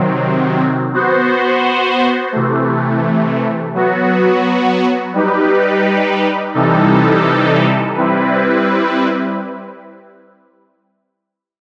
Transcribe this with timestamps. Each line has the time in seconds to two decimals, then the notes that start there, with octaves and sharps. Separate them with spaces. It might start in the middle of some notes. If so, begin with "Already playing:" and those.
Already playing: C3 D#3 F#3 C4
0.93 B3 F#4 C5
2.32 C3 E3 A3
3.74 F#3 B3 F#4
5.13 G3 D#4 G4 B4
6.54 C3 E3 G3 D#4 A4
7.94 G3 C4 E4 B4